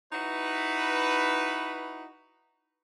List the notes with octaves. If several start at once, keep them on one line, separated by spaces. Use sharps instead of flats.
D#4 E4 F#4 B4